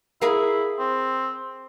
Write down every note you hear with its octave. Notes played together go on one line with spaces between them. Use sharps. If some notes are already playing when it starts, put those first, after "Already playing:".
E4 G#4 A#4 F5
C4